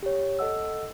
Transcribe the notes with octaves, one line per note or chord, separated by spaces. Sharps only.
G4 C#5
A4 D#5 F#5 E6